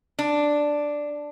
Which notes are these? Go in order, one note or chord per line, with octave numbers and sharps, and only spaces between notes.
D4